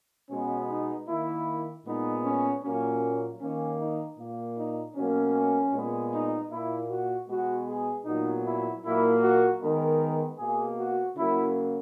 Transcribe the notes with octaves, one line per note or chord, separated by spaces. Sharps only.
B2 G#3 B3 C#4
D#4
D#3 A#3 E4
A#2 G#3 B3 D#4
C#4
A#2 F#3 A#3 C#4
D#3 A#3 C#4
D#4
A#2 A#3
D#4
B2 F#3 A#3 C#4
A#2 G#3 B3
D#4
A#2 A#3 E4
F#4
B2 G#3 B3 F#4
G#4
A#2 F#3 B3 D#4
E4
A#2 F#3 A#3 E4
F#4
D#3 G#3 B3 A#4
B2 A#3 G#4
F#4
C#3 F#3 A#3 E4